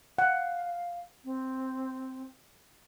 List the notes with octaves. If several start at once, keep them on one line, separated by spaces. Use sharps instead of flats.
F5 F#5
C4